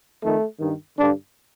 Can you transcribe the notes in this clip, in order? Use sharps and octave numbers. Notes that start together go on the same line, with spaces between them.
F2 D#3 A3
G2 D#3
G2 D3 D4